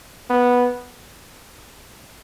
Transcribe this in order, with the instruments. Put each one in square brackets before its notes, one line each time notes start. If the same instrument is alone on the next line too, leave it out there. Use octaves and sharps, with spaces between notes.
[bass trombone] B3